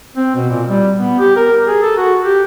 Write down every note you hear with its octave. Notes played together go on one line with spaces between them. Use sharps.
C4
B2
A#2
G3
B3
G4
A#4
G#4
A4
F#4
G4